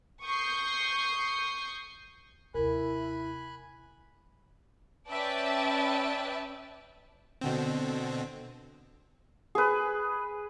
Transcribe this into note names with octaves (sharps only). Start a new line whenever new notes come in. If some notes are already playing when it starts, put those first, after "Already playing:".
C#6 D#6 G6 C7
D#2 C3 E4 A#4 G#5 B5 F#6
C#4 B4 D5 E5 G5 A5
B2 D3 C4
G#4 B4